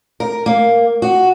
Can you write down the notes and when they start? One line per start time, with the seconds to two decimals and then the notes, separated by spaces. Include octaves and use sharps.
0.20 A#4
0.46 A#3
1.02 F#4